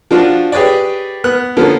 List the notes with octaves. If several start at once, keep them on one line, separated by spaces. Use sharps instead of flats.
F3 D4 F4 F#4
G4 G#4 B4 C#5 D5
B3 F#6
D3 F3 A#3 B3 C#4